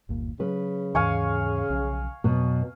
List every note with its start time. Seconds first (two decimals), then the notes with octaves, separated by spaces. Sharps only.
0.09 G1 D#2 A#2
0.40 C#3 F#3 B4
0.95 D#2 G#2 E3 F5 G#5 C#6
1.70 B1 F3 C#4
2.24 F2 B2 F#3 B3